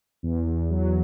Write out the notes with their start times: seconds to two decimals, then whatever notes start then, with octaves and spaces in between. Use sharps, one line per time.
0.23 E2
0.46 E2
0.70 F#3